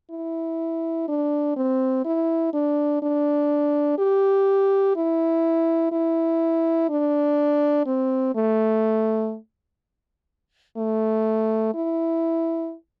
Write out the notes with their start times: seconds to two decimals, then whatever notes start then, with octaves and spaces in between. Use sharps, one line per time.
0.10 E4
1.08 D4
1.56 C4
2.05 E4
2.53 D4
3.02 D4
3.98 G4
4.96 E4
5.92 E4
6.89 D4
7.86 C4
8.35 A3
10.77 A3
11.74 E4